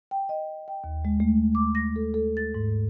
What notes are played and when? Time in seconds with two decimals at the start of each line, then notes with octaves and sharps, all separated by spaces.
0.11 G5
0.29 D#5
0.68 G5
0.84 D#2
1.05 G#3
1.20 A3
1.55 D6
1.75 A#6
1.96 A4
2.14 A4
2.37 A6
2.55 G#2